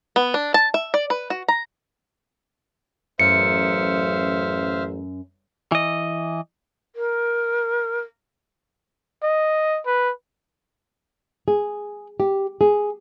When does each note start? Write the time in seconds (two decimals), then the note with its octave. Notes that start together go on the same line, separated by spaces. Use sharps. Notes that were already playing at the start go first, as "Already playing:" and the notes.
0.16 B3
0.34 D4
0.54 A5
0.74 E5
0.94 D5
1.10 B4
1.30 F#4
1.48 A#5
3.19 A1 F#2 C5 E5 F5 C#7
5.72 E3 D#5
6.96 A#4
9.23 D#5
9.86 B4
11.48 G#4
12.20 G4
12.61 G#4